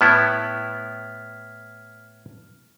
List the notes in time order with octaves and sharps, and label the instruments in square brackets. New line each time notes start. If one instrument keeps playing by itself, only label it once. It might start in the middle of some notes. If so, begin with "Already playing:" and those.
[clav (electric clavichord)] A2 B3 E4 [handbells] F6 G#6 B6